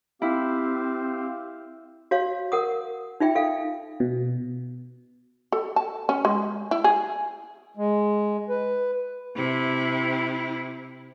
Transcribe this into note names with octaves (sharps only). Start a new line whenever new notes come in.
C4 E4 G4 F5
F#4 C#5 F5
A#4 F#5 D#6
D#4 F4 E5 G5
A4 F5
B2
A4
A5
C#4
G#3
E4
G#4
G#3
B4
C3 E4